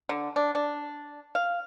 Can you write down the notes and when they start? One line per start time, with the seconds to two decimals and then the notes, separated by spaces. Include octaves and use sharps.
0.09 D3
0.36 D4
0.55 D4
1.35 F5